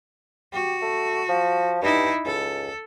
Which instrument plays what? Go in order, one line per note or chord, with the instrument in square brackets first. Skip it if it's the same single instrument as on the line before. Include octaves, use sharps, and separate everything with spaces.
[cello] F#4 [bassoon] G4
[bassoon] A3
F3
[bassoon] G2 [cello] D#4 E4
[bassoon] C#2 [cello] A4